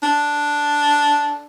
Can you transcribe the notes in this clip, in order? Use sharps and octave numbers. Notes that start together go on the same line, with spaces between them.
D4